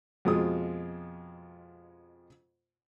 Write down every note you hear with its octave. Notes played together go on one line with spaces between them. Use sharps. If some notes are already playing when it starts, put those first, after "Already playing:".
F2 B2 G#3 F4 D#6